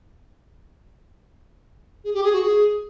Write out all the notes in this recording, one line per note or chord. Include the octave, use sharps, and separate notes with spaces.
G#4
G4
G#4
F#4
G#4